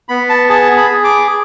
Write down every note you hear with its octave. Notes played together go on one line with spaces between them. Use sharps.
B3 B5
A5
G#4 A5
B5
G#4
D6